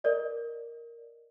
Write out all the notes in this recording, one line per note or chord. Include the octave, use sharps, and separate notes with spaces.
A#4 D5 D#5